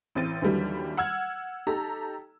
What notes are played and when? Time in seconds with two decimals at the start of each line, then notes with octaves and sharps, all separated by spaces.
0.15 A1 C4 A6 D#7
0.42 D#2 D3 E3 F#3 G3
0.97 F#5 E6 F6 G#6
1.67 D#4 G4 A4 A#5